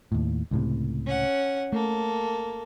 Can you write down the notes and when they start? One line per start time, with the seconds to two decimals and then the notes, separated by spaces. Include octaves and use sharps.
0.12 D#2 A2
0.51 C#2 A2 C3
1.07 C#4 F#5
1.73 A3 A#3 A4